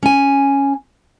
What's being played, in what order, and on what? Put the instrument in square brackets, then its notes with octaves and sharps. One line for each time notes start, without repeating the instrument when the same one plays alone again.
[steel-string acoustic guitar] C#4 G#5